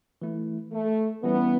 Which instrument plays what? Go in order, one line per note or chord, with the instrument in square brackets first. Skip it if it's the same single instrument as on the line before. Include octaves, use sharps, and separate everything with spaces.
[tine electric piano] E3 A3 E4
[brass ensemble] A3
[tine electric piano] E3 G3 C#4 E4 [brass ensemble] B3